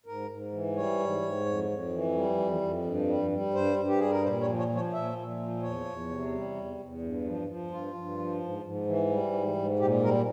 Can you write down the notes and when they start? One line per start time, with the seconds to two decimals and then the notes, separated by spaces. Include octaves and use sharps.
0.06 G#2 A#4
0.30 G#2
0.52 E3
0.76 G3 C#5
0.99 G#2
1.22 G#2
1.45 F2
1.69 F2
1.92 E3
2.15 G3
2.38 F2
2.61 F2
2.85 G2
3.08 G3
3.31 G3
3.54 G2 C5
3.77 G2
3.87 G4
3.99 G3 G#4
4.11 A#4
4.23 A#2 C5
4.41 C#5
4.47 F3
4.58 C#5
4.69 F3
4.75 C#5
4.93 A#2 E5
5.16 A#2
5.39 F3
5.62 E2 C#5
5.86 E2
6.09 C3
6.32 G3
6.55 E2
6.78 E2
7.01 G2
7.25 F3
7.48 F3
7.71 G2 F4
7.94 G2
8.17 F3
8.40 G#2
8.63 G#2
8.87 E3
9.10 G3
9.33 G#2
9.56 G#2
9.79 A#2 G4
10.02 G3 A#4